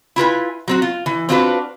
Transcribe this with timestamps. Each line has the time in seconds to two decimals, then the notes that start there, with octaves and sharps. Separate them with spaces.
0.16 E4 F4 B4 G#5
0.68 F#3 C4 F#4
0.82 F4
1.06 E3
1.29 C4 D4 F4 F#4 A4 B4